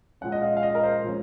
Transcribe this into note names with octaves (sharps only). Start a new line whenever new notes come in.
A#2 F3 G#3 C#4 F#5
D#5
F5
F5
D#5
A#4
C5
A#2 F3 G#3 C#4